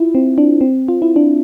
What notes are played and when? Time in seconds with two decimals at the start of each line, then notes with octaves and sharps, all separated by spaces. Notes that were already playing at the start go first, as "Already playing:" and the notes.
Already playing: E4 F4
0.15 C4
0.38 D4
0.61 C4
0.88 F4
1.02 E4
1.16 D4